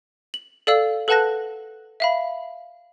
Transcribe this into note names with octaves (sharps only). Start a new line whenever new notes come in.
F#7
A4 D5 F5 E6 F#7
A4 B4 F#5 A5 F#6 A#6
E5 F5 B5